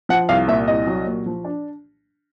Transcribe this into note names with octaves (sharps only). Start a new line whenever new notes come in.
F3 F#5
C2 F5
A#2 E5
C2 D#5
F#3
A#2
F3
D4